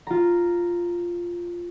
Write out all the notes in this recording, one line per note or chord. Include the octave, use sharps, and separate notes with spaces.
F4 A#5